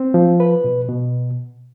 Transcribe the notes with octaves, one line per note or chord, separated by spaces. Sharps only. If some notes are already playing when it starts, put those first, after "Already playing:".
Already playing: C4
F3
B4
B2
B2